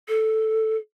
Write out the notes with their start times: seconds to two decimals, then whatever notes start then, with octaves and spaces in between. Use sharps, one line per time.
0.08 A4